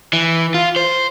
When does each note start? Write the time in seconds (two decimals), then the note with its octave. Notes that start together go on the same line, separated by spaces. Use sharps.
0.13 E3
0.54 F4
0.76 C5